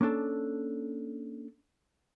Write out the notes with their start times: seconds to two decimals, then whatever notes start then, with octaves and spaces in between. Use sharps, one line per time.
0.01 A#3 C#4 D4 A4